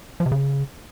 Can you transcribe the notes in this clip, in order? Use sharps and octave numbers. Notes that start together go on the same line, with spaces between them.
F3
C3
C#3